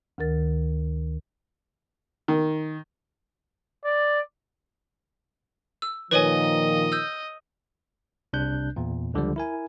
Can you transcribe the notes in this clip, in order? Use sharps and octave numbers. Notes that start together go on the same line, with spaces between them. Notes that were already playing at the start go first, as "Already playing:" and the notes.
D2 D#3 A#4 A6
D#3
D5
E6
A#2 D#3 F3 B4 C#5 D#5 G#5
E6 G6
C2 C3 D4 F#6 G6
E2 A#2
C#2 D3 F3 G3
E4 A#4 G#5